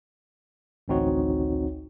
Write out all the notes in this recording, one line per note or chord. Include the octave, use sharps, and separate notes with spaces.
A1 D2 C4 D#4 F#4 C#5